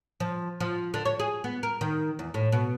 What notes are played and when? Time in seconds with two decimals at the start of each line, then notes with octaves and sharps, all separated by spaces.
0.20 F3
0.60 F3
0.94 D3
1.05 C#5
1.20 G#4
1.44 B3
1.63 A#4
1.81 D#3
2.19 E2
2.34 A2
2.52 B2